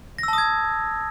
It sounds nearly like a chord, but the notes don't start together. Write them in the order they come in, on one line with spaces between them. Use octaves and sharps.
A#6 E6 A5 D#6 G#6